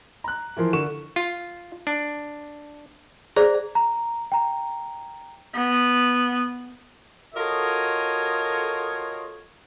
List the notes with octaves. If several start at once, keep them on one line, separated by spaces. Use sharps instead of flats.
A#5 F#6
E3 F3 A#4 C6
D3 A#4 C#6 E7
F4
D4
G#4 C5 D5 A#5
A#5
G5 A#5
B3
F4 F#4 A4 A#4 C#5 D#5